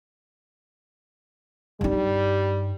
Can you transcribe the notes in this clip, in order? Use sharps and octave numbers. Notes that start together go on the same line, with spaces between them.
G2 G3 D#4